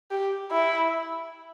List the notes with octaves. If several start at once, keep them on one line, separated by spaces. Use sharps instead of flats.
G4
E4